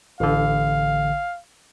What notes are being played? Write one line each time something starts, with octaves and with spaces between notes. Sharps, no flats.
A1 D3 F5